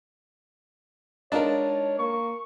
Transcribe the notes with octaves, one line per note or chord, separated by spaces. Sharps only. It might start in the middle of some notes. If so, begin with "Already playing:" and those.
G#3 D4 D#4 F4 A#4 C#5 A5
A#3 C#6